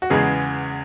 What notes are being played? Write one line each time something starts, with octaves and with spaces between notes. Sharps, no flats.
F#4
E2 C#3 G#3 B3 G#4